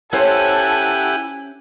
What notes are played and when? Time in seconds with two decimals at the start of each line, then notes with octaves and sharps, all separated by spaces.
0.13 C#4 E4 G4 A4 C5 C#5 F#5 G#5